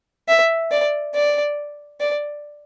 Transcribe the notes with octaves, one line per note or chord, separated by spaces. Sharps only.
E5
D5
D5
D5